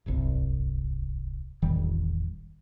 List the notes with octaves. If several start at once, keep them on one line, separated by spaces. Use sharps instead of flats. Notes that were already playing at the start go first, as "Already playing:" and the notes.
D1 G1 C2
E1 A1 D#3 G3